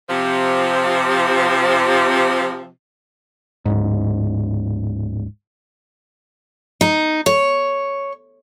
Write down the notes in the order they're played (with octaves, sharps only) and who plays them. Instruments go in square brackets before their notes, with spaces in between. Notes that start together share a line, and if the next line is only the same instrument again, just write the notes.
[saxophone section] C3 F3
[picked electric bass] D1 G#1 G#2
[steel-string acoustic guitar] D#4
C#5